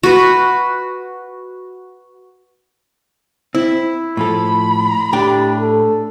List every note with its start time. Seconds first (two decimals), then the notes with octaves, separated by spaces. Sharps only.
0.03 F#4 B4
3.55 C4 E4
4.17 A2 F3 A4 B5
5.13 A2 D4 G4 G5
5.60 A4